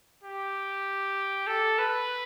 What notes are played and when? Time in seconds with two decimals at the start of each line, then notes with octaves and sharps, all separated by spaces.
0.23 G4
1.47 A4
1.79 B4